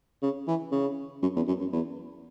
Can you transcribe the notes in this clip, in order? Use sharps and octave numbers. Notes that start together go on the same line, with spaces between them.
C#3
E3
C#3
F#2
E2
F#2
F#2
E2